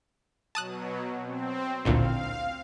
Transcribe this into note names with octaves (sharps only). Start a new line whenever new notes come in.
B2 F#3 A5 D#6 F#6
C4
A1 D2 A#2 F5